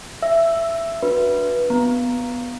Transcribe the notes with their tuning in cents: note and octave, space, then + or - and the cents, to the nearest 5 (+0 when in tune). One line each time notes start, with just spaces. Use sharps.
E5 +15 E6 +0
D4 +0 F#4 +0 B4 -20
B3 +0 A#5 +0